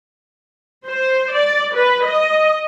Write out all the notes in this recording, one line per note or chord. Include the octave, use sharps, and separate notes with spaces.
C5
D5
B4
D#5